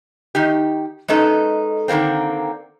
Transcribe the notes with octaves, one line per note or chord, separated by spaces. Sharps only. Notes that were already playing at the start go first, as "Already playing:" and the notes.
D#3 D#4 G4
G#3 C#4 D#4 A4 B4
D3 D#3 G3 A#3 C4